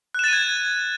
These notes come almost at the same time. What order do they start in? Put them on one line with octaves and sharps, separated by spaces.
F#6 E7 A6 D#7 G#6